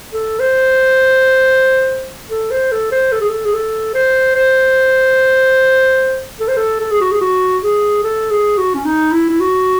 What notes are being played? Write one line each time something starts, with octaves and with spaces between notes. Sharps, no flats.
A4
C5
A4
C5
A4
C5
A4
G#4
A4
G#4
A4
C5
C5
A4
C5
A4
A4
G#4
F#4
G#4
F#4
G#4
A4
G#4
F#4
C#4
D#4
E4
E4
F#4